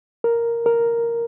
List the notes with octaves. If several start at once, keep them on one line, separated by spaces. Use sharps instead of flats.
A#4
A#4